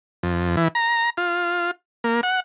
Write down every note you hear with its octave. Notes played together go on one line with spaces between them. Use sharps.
F2
E3
A#5
F4
A#3
F#5